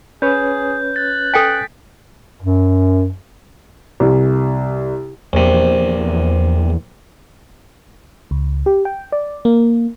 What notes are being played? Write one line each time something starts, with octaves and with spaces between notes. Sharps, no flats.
C#4 G#4 B4 C#5 G6
F#6 A6
A4 G5 G#5 B6 D7
F#2
C2
A#1 E2 C3
C#2
G4
G5
D5
A#3